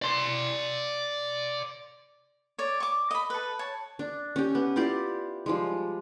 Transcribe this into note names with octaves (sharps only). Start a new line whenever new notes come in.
D5 C6
C#5 D5
C#6 D6
D#5 B5
A4 B4
C#5 A5
D4
C#4 G4
B3
E4 F4 G4 D5
F3 G3 G#3